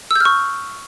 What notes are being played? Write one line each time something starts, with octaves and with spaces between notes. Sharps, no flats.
C#6 E6 F6 G6